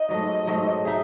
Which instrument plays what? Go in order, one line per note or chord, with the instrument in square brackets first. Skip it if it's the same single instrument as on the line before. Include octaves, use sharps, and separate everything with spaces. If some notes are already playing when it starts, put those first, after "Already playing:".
Already playing: [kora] D#4 [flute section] D#5
[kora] G#2 F#3 A3
G#2 F#3 A3
[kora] D#4 G#4 [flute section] E5